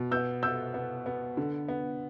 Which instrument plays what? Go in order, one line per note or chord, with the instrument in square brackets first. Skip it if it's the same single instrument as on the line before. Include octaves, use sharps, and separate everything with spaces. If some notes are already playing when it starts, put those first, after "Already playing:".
Already playing: [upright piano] B2
B3 E6 G6
B3 E6 G6
B3
B3
D3
B3